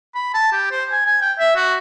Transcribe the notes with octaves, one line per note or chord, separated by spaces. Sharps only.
B5
A5
G4
C5
G#5
G#5
G5
E5
F#4